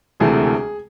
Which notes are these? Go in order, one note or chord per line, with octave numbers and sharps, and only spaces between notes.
E1 D2 C3 E3 A3 G#4